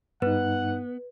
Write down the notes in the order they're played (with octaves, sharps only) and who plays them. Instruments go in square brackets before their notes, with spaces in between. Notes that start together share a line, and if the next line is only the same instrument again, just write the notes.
[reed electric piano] G2 D#4 [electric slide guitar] B3 [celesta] B4 [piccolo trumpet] F#5